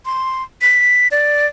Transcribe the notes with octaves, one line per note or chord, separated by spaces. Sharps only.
C6
B6
D5